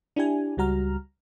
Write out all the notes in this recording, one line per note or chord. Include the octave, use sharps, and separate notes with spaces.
D4 E4 G4 G#5
C#2 G3 F#4 A#5 F6